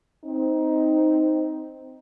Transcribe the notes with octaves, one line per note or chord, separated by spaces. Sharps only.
C4 D#4